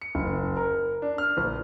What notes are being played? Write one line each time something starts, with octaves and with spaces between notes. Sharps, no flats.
C#7
F#1
A#4
D4
F6
A#1